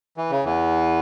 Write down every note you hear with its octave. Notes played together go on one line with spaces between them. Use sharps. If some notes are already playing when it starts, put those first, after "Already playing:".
E3
C#3
E2 E3